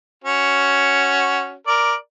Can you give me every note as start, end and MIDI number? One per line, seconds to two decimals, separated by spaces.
0.24 1.54 61
0.24 1.54 66
1.67 1.95 70
1.67 1.95 74